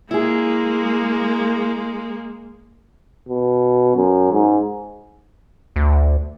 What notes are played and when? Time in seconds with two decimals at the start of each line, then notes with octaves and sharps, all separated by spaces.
0.11 G#3 A#3 E4 G#4
3.29 B2
3.96 F#2
4.32 G#2
5.76 D2